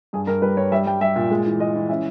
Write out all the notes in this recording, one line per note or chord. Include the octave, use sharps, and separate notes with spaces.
G2 G#4
G2 A#4
G3 B4
G2 C#5
G3 E5
G3 G5
G3 E5
A#2
G#3
E3
G#3 D#5
E3
C#4 E5